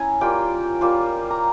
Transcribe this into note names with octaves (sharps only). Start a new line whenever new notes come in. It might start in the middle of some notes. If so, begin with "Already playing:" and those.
Already playing: C#4 E4 G#5 A#5
G3 A#3 F4 G5
G3 A#3 F4
A#5